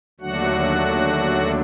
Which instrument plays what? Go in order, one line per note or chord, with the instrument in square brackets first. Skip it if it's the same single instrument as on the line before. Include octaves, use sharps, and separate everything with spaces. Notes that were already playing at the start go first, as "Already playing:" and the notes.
[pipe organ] D#2 D3 F#3 A3 D4 F#4 F#5